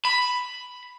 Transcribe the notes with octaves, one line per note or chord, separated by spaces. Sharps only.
B5